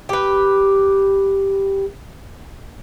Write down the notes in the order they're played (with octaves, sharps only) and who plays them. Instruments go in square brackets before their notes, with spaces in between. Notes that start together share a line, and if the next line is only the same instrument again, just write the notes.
[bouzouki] G4 B4